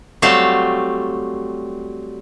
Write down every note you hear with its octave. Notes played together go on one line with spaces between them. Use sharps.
F#3 G3 A3 C4 F5 A5